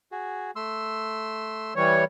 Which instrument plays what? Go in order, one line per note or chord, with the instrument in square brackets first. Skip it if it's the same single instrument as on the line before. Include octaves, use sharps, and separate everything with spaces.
[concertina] F#4 G#4
A3 C6 E6
[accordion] E3 G3 C#5